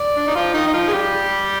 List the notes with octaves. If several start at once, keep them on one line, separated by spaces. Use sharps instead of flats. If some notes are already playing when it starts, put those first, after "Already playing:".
Already playing: D5
D4
D#4
F3 F4
D#3 D#4
D#4
F3 F4
G#4
G3 G4